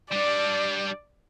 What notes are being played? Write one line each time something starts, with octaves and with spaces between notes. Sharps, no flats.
G3 D4 D5